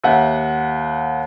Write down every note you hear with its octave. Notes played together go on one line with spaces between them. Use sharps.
D#2 E5 F#5